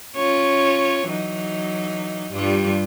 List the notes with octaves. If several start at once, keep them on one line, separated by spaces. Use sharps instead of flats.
C#4 F4 C#5
E3 F#3 D#4
G2 G3 F4